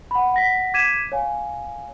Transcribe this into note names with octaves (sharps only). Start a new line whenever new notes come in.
F#5 B5
F#5 A#6 B6
D6 G#6 B6 D#7 E7
C#5 F5 G#5